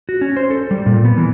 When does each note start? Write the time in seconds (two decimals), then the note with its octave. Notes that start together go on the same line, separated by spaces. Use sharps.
0.09 F#4
0.21 C#4
0.37 C5
0.50 A4
0.71 G3
0.86 A#2
1.05 B3
1.18 E3